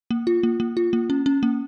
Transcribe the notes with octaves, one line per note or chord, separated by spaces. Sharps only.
A#3
F4
A#3
A#3
F4
A#3
C#4
C#4
A#3